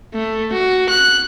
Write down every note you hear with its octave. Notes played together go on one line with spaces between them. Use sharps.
A3
F#4
F#6